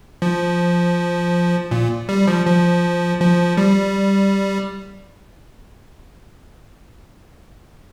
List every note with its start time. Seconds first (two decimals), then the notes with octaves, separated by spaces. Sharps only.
0.22 F3
1.71 A#2
2.09 G3
2.28 F3
2.46 F3
3.20 F3
3.57 G3